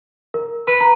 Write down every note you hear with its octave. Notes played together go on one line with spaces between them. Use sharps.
A#4
B4 B5
A#5